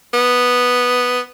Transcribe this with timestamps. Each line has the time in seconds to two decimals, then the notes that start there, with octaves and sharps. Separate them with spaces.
0.14 B3